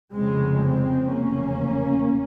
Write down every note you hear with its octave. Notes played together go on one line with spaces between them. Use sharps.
F1 F2 C#3 G#3 C4
G#3 C4
F1 E2 C#3 A#3 C#4